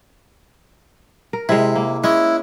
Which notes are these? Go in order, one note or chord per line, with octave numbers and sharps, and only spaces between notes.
A#4
C3 G#3 E4
A#3
G#3 C#4 E4